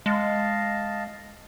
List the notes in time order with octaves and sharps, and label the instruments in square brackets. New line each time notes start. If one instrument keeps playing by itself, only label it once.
[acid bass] G#3 [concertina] D#5 F5 A5